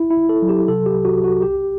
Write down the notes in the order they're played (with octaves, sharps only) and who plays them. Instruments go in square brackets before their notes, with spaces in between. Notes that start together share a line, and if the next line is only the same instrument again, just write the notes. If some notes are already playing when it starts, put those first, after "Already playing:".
Already playing: [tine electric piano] G1 E4
E4
G1
A4
F#3
G4
C3 A4
G4
C2
F#4
C2
F#4
B1 G4